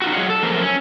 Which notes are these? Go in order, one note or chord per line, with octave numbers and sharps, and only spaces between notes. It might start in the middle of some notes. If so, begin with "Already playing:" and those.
D#4 F4 F#4
F#3 G#4 C#5 D#5 F5 F#5
A4
F#2 F3 A3 A#3 A#4
C#4